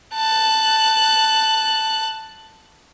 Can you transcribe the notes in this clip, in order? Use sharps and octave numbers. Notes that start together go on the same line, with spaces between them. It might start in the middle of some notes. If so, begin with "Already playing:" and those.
A5 F#6